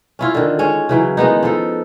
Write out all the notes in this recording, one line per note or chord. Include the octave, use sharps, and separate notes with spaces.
C#4 E4 F4
D3 D#3
G#3 C#4 C#5
C#3 E3 F#3
D#3 G#3 B3 D#4
F3 D#4 A4